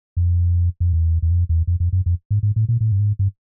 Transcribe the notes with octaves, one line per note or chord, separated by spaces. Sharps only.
F2
F2
E2
E2
F2
E2
F2
F2
F#2
F2
G#2
G#2
A2
A#2
A2
G2
G#2
G2